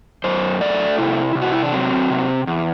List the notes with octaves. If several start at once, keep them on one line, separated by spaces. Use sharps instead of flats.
F#2 C5
A3 D5
C3 E4
C3
F#4
E4
D4
F#3 C4
C3
E2